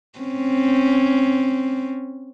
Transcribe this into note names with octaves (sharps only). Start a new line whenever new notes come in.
C4 C#4